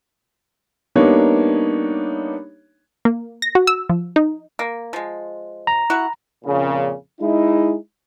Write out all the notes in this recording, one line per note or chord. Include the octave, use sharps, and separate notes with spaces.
G3 A#3 B3 D4 D#4 C#5
A#3
A#6
F#4
E6
F3
D#4
A#3
F3 G#3
A#5
E4 F#4 F#5
F2 A#2 C#3
G#3 D#4 E4